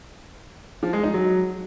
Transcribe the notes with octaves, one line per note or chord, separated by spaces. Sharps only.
F3
G#3
D#4
F#3